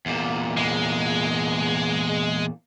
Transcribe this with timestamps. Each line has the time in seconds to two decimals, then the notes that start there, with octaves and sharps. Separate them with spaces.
0.06 E2 A#2
0.57 G#3